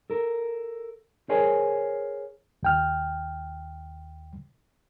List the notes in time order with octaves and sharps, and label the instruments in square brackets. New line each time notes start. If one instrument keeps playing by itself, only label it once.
[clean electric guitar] A4 A#4
G#4 A#4 C5 C#5 G#5
[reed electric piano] D#2 G5 F6